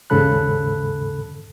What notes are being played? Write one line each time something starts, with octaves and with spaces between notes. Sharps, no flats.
D#2 G#2 C#3 A4 B5 F#6